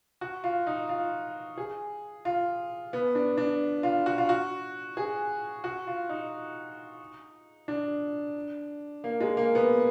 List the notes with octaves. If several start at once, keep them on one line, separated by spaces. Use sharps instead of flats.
F#4
F4
D#4
F4
G#4
F4
B3
D4
D4
F4
F#4
F4
F#4
G#4
F#4
F4
D#4
D4
A#3
G#3
A#3
B3